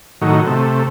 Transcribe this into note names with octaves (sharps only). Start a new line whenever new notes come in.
A2 D#3 F#3
C3 A3